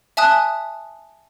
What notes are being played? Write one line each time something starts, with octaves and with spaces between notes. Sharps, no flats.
E5 G#5 A5 D#6 F#6